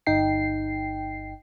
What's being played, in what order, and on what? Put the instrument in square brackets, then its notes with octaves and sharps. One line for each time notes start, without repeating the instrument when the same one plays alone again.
[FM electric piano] G1 D#4 G5 C7